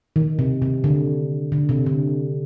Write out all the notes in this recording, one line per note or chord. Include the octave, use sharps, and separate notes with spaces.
D#3
C3
C3
D3
D3
C3
D3